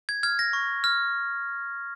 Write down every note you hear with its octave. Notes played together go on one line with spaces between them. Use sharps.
G#6
F6 G#6
A#6
C#6
F6